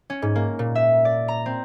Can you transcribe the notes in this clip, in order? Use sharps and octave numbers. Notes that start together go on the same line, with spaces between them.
C#4
G#2
A#3
A#2
E5
D5
A#5
C4